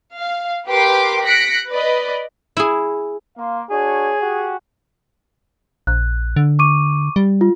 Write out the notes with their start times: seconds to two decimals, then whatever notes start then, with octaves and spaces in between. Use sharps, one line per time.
0.18 F5
0.68 G4 A#4 B4 G5 C6 D6
1.24 F#6 A#6 B6 C#7 D7
1.68 B4 D5 D#5
2.57 E4 G#4
3.37 A#3 F5 C6
3.70 D4 F#4 G#4 C#5
4.21 F#4 G4 G#5
5.87 A#1 F#6
6.36 D3
6.59 C#6 D6 D#7
7.16 G3
7.41 F4